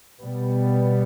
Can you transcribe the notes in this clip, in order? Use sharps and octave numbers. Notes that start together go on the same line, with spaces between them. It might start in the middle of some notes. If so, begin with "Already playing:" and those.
B2 G3 B3